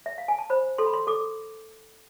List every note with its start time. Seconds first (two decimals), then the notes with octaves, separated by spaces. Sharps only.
0.06 E5
0.18 F5
0.28 G#5
0.39 A5
0.50 C5 B5
0.78 A4 C6
0.86 B5
0.93 C6
1.07 A4 D6